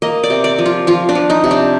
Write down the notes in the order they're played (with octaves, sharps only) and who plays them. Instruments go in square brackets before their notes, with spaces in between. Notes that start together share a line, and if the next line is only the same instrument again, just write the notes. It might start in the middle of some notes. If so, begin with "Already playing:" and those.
[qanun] A#3 D#5
D5
C3
D5
F3
F4
F3 F4
D4
F3
D#4
C3
D4